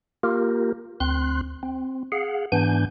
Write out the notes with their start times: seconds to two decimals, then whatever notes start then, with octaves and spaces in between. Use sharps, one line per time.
0.23 A#3 F4 G4 A#4
1.00 D2 C4 C6 F#6
1.63 C4
2.12 G#4 F5 F#5
2.52 G#2 E3 B3 D4 G#5 G6